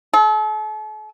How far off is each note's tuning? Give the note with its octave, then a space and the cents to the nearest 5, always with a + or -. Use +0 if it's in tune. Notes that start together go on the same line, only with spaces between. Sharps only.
A4 -40